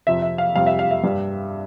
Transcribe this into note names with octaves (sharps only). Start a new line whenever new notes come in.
F2 C3 F3 E5
E5
F5
F2 C3 G3 F5
E5
F5
E5
G2 G3